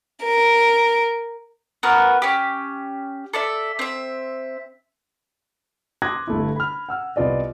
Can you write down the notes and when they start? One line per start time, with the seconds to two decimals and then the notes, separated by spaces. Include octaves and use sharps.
0.24 A#4
1.83 B3 F#4 A#4 B4
2.22 C#4 G4
3.33 A4 D5 E5
3.79 C4 E5
6.02 C6 D6 D#6 F#6 G#6 A#6
6.27 G1 A3 E4
6.56 B5 F6
6.89 F#5 E6 F6
7.16 C2 B3 F4 D5 D#5